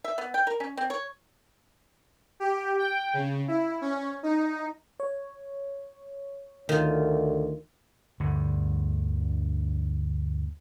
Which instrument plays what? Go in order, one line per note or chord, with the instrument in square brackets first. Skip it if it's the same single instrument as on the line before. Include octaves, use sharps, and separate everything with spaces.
[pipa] E5
B3
G5
A#4
C#4
C4
C#5
[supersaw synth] G4
G5
C#3
E4
C#4
D#4
[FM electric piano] C#5
[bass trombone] D2 [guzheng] D#3 F4
[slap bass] D2 G2 D3